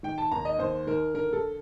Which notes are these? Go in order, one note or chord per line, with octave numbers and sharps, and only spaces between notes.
D#3 G5
A5
D#2 A#5
D#5
D#2 C5
D#3 A#4
D3 A#4
A4